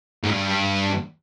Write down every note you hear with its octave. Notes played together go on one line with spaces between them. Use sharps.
G#2
G2